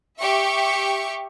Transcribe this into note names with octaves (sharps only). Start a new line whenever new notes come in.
G4 E5 C#6